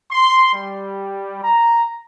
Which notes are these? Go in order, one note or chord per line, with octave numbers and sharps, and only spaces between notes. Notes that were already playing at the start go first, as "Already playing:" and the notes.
C6
G3
A#5